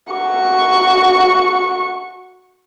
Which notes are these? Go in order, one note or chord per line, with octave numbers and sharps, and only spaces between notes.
F#4 C#6